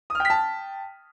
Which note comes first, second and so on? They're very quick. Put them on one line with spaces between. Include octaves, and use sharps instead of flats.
D#6 F6 G5 B6 A5